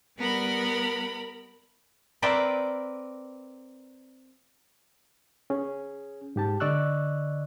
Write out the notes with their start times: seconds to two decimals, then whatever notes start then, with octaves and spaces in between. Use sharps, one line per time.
0.19 G3 B3 A#4 B5
2.22 C4 A#4 B4 D5 E5 G5
5.50 C#4 G#4
6.36 G#2 G4 A5
6.60 D3 D5 D#5 C#6 E6 F#6